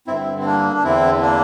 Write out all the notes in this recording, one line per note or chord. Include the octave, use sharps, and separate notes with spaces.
G2 D3 C4 E4
C4
A#3 D4
D4
E2 D3 C4 E4
A#3 D4